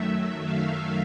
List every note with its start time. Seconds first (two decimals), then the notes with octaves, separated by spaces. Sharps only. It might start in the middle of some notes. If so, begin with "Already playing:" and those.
Already playing: F#2 D#3 F#3 A3 E5
0.42 F5